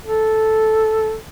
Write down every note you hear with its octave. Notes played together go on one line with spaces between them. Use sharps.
A4